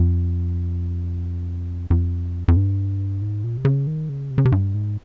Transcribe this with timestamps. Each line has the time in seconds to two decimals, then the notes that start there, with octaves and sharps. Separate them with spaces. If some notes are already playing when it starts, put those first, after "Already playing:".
Already playing: F2
1.90 F2
2.48 F2
2.57 G2
3.22 G#2
3.44 A#2
3.57 C3
3.65 C#3
3.87 D#3
4.09 C#3
4.31 C3
4.38 C#3
4.45 C3
4.52 G2
4.74 G#2